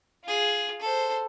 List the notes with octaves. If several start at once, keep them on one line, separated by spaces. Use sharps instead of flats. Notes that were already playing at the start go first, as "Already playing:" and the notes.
F4 G#4
A4 C5